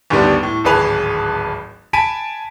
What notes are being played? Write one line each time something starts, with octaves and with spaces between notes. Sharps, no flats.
D2 G2 D#3 G3 B3 D4
A2
D1 G#1 G#4 B4 A5 F7
G#5 A5 B5 B6 D7 D#7